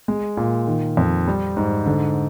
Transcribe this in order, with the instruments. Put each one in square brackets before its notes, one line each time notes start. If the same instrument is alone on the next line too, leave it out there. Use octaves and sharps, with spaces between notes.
[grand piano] G#3
A#2
D#3
F2
G3
G#2
D3